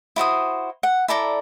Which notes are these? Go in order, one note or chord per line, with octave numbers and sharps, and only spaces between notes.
E4 F#4 C5 D#6
F#5
E4 A4 D5 A#5